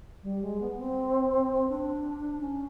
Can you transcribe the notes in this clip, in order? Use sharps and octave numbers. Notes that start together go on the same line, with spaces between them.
G3
G#3
B3
C4
D4
C#4